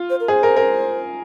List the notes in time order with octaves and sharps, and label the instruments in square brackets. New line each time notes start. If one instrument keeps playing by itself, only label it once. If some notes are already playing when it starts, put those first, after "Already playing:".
Already playing: [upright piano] F4
[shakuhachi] C5
A#4
[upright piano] G#4 [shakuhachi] C5
[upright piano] A#4
A#4